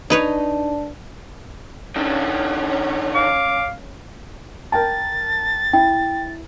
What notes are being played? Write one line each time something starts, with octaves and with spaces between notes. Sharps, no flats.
D4 D#4 G#4 B4 C#5
D#3 C#4 D4 C#5
F5 D6
A#4 G5 A5 A6
E4 G5